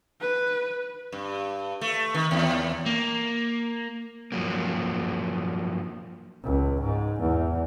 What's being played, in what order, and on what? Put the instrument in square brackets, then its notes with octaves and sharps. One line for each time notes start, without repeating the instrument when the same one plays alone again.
[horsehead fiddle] B4
[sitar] G2
A3
D#3
D#2
[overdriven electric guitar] A#3
[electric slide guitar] G2 F3 F#3 A#3
[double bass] C#2
G#2
E2